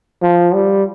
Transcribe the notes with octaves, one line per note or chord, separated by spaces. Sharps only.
F3
G3